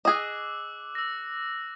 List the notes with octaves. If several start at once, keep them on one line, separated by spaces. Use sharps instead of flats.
G#4 D#5 D6 E6 F#6
E6 A#6